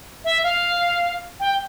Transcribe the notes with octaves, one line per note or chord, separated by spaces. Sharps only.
E5
F5
G5